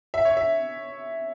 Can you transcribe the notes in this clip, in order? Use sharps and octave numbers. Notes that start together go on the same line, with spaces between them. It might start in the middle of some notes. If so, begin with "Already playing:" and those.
E5
C#5
E5